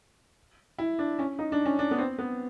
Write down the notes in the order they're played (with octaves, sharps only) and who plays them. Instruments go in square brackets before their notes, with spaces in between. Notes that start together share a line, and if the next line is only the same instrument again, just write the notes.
[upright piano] E4
D4
C#4
D#4
D4
C#4
D4
B3
C4
B3